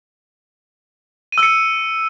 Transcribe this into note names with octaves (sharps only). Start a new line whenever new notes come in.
D#7
E6
C#7